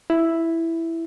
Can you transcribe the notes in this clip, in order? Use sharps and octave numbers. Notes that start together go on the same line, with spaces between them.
E4